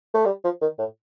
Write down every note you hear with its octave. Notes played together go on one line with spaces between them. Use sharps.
A3
G3
F3
D#3
A2